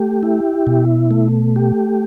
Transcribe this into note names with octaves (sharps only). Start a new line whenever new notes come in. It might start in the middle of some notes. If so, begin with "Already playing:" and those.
Already playing: A3 G4
E4
B2
A3
G4